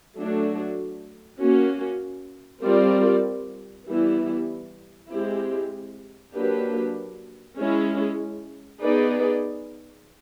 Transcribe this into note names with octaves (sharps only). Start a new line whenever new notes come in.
F#3 A3 D4 F#4
A#3 C#4 F#4
G3 C4 F4 A#4 D5
E3 G3 B3 E4
G#3 C4 E4 G4
F#3 A#3 D4 G4 B4
G#3 C#4 E4
B3 D#4 G#4 B4 D5